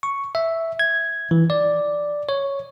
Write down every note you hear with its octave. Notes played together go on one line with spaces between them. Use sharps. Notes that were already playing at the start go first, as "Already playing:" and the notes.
C#6
E5
G#6
E3
D5
C#5